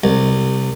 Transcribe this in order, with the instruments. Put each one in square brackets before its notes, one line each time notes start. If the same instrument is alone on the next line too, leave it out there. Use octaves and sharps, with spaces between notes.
[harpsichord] C2